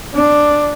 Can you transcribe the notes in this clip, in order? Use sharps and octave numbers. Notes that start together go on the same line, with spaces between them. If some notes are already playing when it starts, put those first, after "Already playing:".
D4